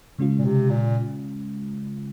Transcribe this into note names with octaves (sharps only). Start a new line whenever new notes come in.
C#3 G#3 C#4 F4
A#2
C3
A#2